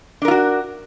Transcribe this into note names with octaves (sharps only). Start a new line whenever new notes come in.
D4 F4 F#4 A#4